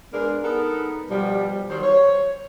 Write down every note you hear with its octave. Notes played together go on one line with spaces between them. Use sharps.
G#3 B3 D4 G#4 A#4
B3 D#4 A4 A#4
B2 F3 G3
D#3 F#3 G3 C5
C#5